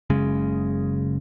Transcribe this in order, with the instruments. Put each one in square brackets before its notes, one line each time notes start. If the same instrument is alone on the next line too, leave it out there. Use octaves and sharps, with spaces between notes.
[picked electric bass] F#1 C#3 G#3